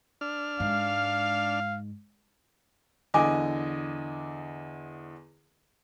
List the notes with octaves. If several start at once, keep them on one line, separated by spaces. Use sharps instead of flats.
D4 F6
G#2 F5
E2 D3 D#5 G#5 D6